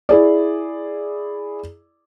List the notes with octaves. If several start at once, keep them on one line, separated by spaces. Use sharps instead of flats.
E4 G#4 D5